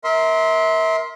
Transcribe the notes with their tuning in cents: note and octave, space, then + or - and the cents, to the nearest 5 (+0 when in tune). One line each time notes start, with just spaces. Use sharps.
A#4 +10 E5 -30 C6 +0